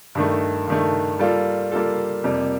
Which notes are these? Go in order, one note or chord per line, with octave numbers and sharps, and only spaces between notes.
G2 D#3 A3
G2 D#3 A3
G3 A#3 F4 A4
G3 A#3 F4 A4
F2 C3 G3 A#3